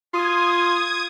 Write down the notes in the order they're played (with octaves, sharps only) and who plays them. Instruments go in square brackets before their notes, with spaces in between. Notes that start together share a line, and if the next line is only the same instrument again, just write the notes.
[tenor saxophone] F4 [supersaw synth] D#6 G#6